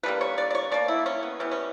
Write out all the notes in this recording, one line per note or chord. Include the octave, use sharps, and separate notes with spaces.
D3 G3 A#3 B4
C#5
D5
D5
C#5
B2 A#3 D5
E4
C#4
B3
E3 G3 B3 C#4
C#4